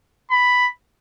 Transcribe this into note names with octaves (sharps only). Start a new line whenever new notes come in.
B5